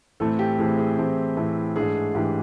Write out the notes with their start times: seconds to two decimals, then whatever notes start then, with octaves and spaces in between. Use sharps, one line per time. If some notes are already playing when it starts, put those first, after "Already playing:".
0.20 A2 E3 A3 C4 A4
0.39 G4
0.58 A2 E3 A3 C4 G#4
0.78 G#4
0.98 A2 E3 A3 C4
1.37 A2 E3 A3 C4
1.76 G#2 E3 A3 D4 G#4
2.15 G#2 E3 A3 D4 G4